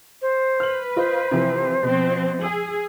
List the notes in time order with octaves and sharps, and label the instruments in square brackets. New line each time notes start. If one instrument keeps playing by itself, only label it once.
[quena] C5
[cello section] B4 [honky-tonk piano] F6 F#7
[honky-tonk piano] F4 D#5 [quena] C5
[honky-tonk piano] C3 E3 F3
[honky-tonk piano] B2 [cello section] F3 C4
[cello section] G#4 [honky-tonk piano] G#5 E6 F#7